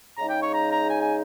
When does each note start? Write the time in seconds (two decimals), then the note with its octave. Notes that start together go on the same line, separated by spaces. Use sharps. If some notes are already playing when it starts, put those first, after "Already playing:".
0.18 C#3 G#3 D#4 A#5
0.29 G5
0.42 C#5
0.54 A#5
0.72 A#5
0.89 G#5
1.02 G#5